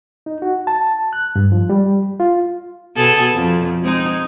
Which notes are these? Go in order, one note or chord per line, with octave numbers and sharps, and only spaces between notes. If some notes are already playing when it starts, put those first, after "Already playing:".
D#4
F#4
A5
F#6
G2
F3
G3
F4
B2 G#4 A4
F2
G#3 C4 D#4